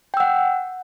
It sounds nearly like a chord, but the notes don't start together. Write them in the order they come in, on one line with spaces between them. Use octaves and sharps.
G5 E6 F#5